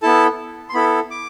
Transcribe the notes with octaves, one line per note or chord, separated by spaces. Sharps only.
B3 E4 A4 A5
C6
B3 E4 A4 B5
D6